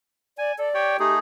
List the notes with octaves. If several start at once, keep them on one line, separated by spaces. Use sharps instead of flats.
D5 G#5
A4 D5
G4 C#5 G5
A3 D#4 G4 G#4